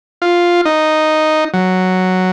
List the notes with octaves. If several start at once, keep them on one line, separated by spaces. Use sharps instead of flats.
F4
D#4
F#3